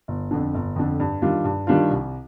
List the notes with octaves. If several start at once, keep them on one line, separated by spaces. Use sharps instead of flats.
G1
F2 D3
G1
F2 D3
G2
D#3 G3 D4 F4
G2
D#3 G3 D4 F4
C2